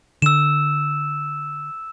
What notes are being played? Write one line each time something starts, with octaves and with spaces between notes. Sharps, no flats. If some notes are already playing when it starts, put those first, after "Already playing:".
D3 E6 E7